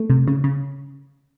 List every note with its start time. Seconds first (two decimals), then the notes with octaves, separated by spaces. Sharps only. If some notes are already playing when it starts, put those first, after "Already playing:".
Already playing: A3
0.10 C3
0.28 C#3
0.44 C#3